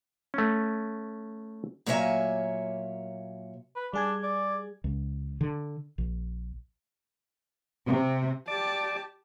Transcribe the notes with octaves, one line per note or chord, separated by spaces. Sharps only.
A3 C#4
A#2 F#3 A#3 C#5 E5 G#5
B4
G3 D4 G#4 G#6
D5
C#2
D3
A#1
C3
G4 D5 A5